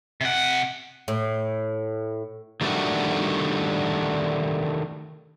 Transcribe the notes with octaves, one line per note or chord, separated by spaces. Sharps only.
C3 F#5
A2
D#3 G3 A3 A#3 D4 F#4